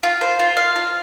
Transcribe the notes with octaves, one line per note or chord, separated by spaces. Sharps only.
F4
C5
F4
F5
F4